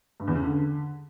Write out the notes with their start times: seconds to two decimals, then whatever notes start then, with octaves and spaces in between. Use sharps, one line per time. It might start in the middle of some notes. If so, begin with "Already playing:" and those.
0.20 G2
0.27 E2
0.35 C#3
0.43 D3